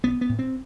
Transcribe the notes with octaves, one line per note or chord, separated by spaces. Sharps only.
B1 B3
B3
A2
C4